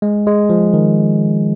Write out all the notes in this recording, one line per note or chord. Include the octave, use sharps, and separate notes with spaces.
G#3
G#3
F3
D#3